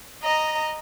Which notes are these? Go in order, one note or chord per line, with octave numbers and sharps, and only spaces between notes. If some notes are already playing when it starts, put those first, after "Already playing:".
D#5 A#5